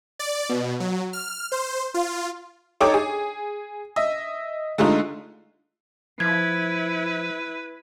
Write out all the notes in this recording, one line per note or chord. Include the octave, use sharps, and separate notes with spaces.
D5
B2
F#3
F6
C5
F4
D#4 A4 C#5 G5 D6
G#4
D#5 E5
D3 G#3 A3 D#4 F4
F3 E4 B4 G#6